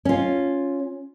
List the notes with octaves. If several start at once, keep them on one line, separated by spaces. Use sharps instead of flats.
C#4 F4